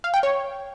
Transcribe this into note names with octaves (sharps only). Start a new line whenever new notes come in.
F5
G5
C#5